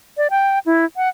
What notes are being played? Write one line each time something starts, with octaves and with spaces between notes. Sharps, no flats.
D5
G5
E4
F#5